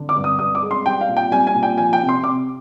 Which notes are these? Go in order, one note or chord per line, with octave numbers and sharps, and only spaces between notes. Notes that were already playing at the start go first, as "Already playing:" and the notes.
Already playing: D3
D6
G2
D#6
G2 D#6
D6
G#3
C6
G3 G5
F5
A#2
G5
G3 G#5
G#5
A#2
G5
F3 G#5
G5
C3
C6
C3 D6